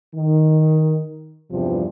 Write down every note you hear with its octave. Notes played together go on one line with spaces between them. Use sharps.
D#3
E2 G2 C3 F3 G3